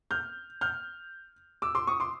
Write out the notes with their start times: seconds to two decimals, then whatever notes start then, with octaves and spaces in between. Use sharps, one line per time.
0.11 F6 G6
0.61 F6 G6
1.62 D6 E6
1.75 C6 D6
1.87 C#6 D#6
2.00 C6 D6